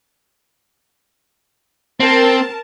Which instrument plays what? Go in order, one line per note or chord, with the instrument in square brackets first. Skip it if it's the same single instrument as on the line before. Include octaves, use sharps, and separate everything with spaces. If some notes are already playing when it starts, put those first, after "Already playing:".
[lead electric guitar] C4 [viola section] A#4 A5